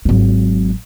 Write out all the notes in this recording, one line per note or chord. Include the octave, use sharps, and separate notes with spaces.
G#1 F#3